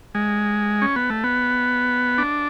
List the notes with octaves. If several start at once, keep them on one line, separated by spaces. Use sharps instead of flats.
G#3
C#4
B3
A3
B3
D4